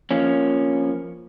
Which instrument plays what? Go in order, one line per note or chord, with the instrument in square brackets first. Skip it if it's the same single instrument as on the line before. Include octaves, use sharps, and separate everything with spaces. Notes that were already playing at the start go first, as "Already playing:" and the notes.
[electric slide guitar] F3 A#3 C#4